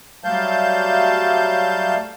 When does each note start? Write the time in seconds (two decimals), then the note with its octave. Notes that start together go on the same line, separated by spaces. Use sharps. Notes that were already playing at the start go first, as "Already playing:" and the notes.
0.24 F#3 G3 A3 F5 A5 G6